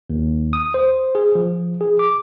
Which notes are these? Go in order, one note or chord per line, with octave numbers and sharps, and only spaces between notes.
D#2
D#6
C5
G#4
F3
G#4
D6